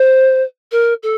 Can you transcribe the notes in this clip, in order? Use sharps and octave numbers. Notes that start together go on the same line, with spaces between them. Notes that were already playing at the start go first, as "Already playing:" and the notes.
Already playing: C5
A#4
A4